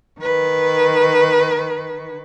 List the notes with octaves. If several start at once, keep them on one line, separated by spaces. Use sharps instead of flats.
D#3 B4